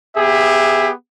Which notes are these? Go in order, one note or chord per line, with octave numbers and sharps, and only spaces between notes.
B3 G4 G#4 E5